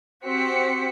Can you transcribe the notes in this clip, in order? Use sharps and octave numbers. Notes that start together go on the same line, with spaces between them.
C4 F#4 G4 C5 B6 C#7